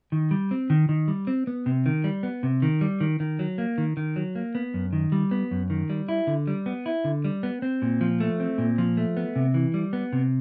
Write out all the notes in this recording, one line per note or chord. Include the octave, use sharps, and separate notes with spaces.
D#3
G3
C4
D#3
D#3
G3
C4
B3
C3
D#3
G3
B3
C3
D#3
G3
D#3
D#3
F#3
A#3
D#3
D#3
F#3
A#3
B3
F#2
D#3
G3
B3
F#2
D#3
G3
E4
D3
G3
B3
E4
D3
G3
B3
C4
A#2
F3
A3
C4
A#2
F3
A3
B3
C3
E3
G3
B3
C3